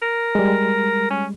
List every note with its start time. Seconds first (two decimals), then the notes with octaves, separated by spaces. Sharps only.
0.02 A#4
0.35 G3 G#3
1.10 C#4